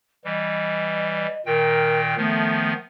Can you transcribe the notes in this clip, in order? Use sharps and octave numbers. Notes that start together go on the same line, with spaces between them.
E3 G3 D#5
A#2 D#3 A#4 G5
D#3 F3 A3 B3